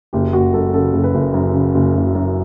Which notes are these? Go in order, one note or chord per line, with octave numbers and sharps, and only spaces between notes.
F#1 G4
F#1 F#4
F#2 A4
C#3 A4
F#1
B4
F#1
F#2
C#3
F#1
F#1
F#2